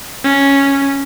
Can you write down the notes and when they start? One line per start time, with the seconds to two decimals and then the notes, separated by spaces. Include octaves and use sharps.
0.24 C#4